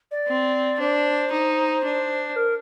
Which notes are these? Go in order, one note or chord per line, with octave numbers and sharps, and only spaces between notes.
D5
C4
D4 C5
D#4
D4
A#4